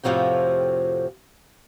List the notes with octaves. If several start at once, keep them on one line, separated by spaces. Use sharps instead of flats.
F2 A2 C3 F3 F#4 G5